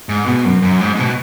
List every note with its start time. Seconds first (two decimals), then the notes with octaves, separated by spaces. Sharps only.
0.09 G#2
0.26 B2
0.45 F#2
0.62 F#2
0.81 G#2
0.95 G#2
0.99 B2